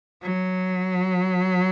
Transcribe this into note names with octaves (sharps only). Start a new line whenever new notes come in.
F#3